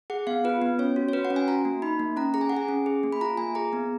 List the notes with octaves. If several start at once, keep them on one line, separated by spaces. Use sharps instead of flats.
G#4 F#5
B3 F5
F4 B4
B3
C#4 C#5
F#4
C#5
F#4 B4
F#5
C#4
G#5
F#4 A#5
A#3
D#4 B5
A#3
C#4 A#5
G#4 A#5
G#5
F#5
G#4 G#5
C#4
G#4
A#3
B5
F4 A#5
A#3 G#5
G#4 A#5
B3